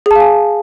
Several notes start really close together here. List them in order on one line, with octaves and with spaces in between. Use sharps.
G#4 A5 F5 G#5